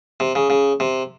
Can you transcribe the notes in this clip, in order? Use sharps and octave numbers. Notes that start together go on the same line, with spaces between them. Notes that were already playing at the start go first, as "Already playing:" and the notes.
C3
C#3
C#3
C3